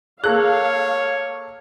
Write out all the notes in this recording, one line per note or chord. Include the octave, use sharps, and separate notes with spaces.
A#3 G#4 A4 C#5 F5 F#6